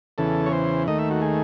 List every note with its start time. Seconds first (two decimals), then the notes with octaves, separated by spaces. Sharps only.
0.18 E2 C#3 E3 A4
0.46 C#5
0.52 C5
0.87 D#2 D#3 A3 D#5
0.99 E5
1.11 F#4
1.22 G#4